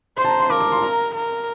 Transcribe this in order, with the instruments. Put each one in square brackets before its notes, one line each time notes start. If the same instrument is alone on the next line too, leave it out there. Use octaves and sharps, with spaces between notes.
[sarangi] C5 [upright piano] C6
[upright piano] A5
A#5
C6
[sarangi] A#4 [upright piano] D6
[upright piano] D6
C6
A#5
[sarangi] A#4